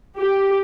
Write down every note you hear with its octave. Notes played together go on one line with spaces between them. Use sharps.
G4